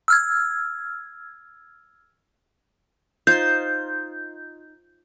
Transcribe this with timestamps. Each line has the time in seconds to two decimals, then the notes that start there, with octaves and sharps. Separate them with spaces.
0.08 E6 F6 G#6
3.27 D#4 F4 C5 G6